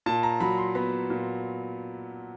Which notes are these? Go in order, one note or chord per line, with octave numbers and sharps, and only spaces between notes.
A#2 A5
A#5
F#3 B5
C6
B3 B5
A#2